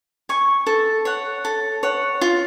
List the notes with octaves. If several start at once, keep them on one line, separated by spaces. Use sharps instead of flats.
G#5 C#6
A4
C#5 F#5
A4
C#5 F#5
F4